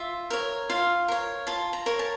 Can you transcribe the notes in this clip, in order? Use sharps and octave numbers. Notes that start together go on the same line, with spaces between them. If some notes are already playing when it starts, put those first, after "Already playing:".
Already playing: F4 E5
A#4 C#5
F4 F5
A#4 C#5
F4 A5
A#5
A#4 C#5
A5